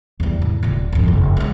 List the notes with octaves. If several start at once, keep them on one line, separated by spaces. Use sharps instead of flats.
E2 G3
A2
D#1 A#2
G#1 F2
F#1
F#3 G#3